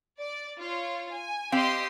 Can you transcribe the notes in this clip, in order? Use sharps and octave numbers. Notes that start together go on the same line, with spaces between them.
D5
F4 C#5
G#5
C4 G4 D#5 F5 C6